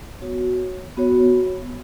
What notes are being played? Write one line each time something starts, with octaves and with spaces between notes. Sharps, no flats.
B3 F#4 C#5
B3 F#4 C#5